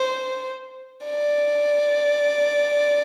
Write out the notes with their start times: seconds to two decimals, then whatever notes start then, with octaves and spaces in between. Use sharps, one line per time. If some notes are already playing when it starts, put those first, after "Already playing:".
Already playing: C5
1.05 D5